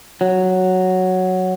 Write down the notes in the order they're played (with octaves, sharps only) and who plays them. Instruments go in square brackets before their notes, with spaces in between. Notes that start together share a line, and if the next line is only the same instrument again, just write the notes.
[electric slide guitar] F#3